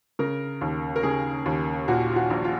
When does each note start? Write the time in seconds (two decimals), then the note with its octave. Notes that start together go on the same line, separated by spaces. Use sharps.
0.19 C#3 A#4
0.61 D#2
0.96 A#4
1.03 C#3 G#4
1.46 D#2
1.88 A#2 F#4
2.12 F4
2.16 F#4
2.30 A#1
2.44 F4